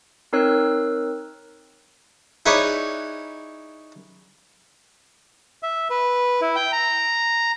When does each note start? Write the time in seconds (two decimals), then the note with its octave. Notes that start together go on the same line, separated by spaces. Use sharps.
0.33 C4 D#4 A#4 C#5 E6 F#6
2.46 D#4 E4 G#4 B4 C#5 D5
5.63 E5
5.90 B4
6.41 E4
6.56 G5
6.72 A#5